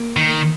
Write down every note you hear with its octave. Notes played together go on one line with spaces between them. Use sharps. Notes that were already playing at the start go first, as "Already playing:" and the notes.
Already playing: A#3
D#3